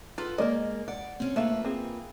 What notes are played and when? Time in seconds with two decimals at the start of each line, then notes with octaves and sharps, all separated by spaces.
0.18 F4 A4 B4 F#5
0.38 G#3 A#3 A#4 D5 D#5
0.88 D5 F#5
1.20 C4 C#4
1.36 A3 A#3 F4 B4 E5 F5
1.65 C4 G#4